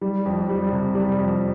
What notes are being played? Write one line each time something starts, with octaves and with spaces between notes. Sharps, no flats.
G3
F2
G3
C3
G3
F2